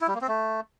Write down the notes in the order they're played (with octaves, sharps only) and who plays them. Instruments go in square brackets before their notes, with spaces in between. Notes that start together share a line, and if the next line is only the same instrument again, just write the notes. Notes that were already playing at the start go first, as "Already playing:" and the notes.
[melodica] E4
G3
A#3
C4
A3